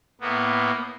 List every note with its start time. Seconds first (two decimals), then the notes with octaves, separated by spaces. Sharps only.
0.21 A2 A#3 B3